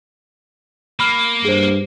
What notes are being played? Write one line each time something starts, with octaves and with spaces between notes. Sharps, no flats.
A#3 B5 F6
G2 G#4 C5